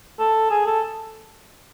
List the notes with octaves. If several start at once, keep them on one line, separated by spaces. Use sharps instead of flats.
A4
G#4
A4